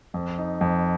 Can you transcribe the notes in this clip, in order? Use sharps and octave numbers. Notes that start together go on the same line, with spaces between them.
F2
D#4
F2